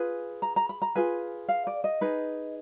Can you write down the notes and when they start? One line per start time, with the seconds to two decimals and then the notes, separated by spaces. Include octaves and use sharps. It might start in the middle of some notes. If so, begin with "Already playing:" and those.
Already playing: F4 G#4 B4 G#5
0.42 A#5
0.56 A#5
0.69 B5
0.82 A#5
0.95 F4 G#4 B4 G#5
1.49 F5
1.67 D5
1.84 D#5
2.01 D#4 G#4 B4